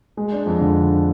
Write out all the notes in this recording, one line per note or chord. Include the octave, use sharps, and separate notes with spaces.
G#3
D4
F2
D3